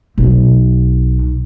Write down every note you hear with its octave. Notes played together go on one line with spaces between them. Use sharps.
B1